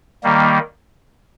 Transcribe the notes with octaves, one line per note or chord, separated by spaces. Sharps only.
D#3 G3 A#3